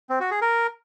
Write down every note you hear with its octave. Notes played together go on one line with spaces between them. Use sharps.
C4
F#4
G#4
A#4